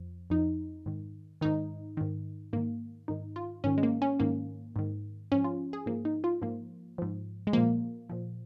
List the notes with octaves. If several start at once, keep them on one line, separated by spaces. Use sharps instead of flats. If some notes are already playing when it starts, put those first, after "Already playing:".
Already playing: F2 F3
F2 F3 D#4
G#2 D#3
G#2 D#3 D#4
G#2 D#3
G#2 D#3 A#3
G#2 D#3 D#4
F4
G#2 D#3 C#4
G#3
A#3
C#4
G#2 D#3 A#3
G#2 D#3
G#2 F3 C#4
F4
G#4
G#2 F3 A#3
D#4
F4
G#2 F3 A#3
G#2 F3
G#3
A#2 F3 A#3
A#2 F3